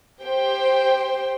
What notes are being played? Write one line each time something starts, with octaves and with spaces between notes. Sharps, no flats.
G4 C5 G5